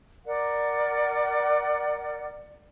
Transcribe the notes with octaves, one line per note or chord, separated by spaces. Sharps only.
A#4 D5 F#5